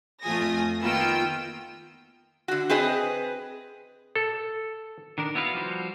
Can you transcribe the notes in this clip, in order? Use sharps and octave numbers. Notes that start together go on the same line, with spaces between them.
F2 A3 F4 G#5 D#6 A#6
D#3 A#3 B3 F4 G5 E6
D3 F#4
C4 G#4 B4 D#5
A4
D#3 D4 A#4
B3 E4 F#4 B4 F5
F3 G3 F#4 C5